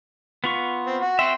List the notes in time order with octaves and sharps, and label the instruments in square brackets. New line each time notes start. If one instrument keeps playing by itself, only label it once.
[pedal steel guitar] B3 F4 C#6
[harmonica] C4
F#4
[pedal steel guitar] F#4 E5 [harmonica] G5 C6